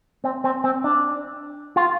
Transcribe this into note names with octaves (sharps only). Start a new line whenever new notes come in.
C4
C4
C4
D4
F4